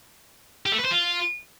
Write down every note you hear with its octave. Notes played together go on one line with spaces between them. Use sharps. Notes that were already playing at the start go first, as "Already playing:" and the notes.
G4
A3
B4
C5
F4